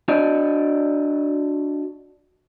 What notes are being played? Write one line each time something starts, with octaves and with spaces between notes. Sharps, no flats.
D4 F#4 D5 D#5